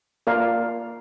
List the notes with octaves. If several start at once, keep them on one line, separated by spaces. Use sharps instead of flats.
A#3 F4 A#4 D5 F5